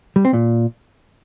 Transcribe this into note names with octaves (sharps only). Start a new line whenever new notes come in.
G3
C4
A#2